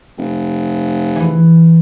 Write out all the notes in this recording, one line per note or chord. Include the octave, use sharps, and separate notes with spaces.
F1
E3